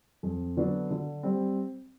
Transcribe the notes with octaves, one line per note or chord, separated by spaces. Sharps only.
F2
D3 F#3 B3 D4
D3
G3 C4